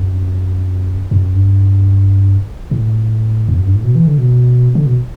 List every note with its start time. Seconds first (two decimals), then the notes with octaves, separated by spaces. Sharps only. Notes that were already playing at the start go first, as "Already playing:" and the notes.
Already playing: F#2
1.11 F#2
1.35 G2
2.71 A2
3.49 E2
3.57 F#2
3.66 G2
3.75 A2
3.84 B2
3.96 E3
4.07 D3
4.18 B2
4.75 D3
4.86 B2